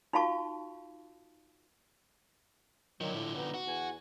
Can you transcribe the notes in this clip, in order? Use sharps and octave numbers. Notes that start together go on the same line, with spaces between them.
D#4 F4 F#4 F5 A5 C#6
D3 D#3 F3 F#3
A2
B3 D#4
F#4
E2 G#5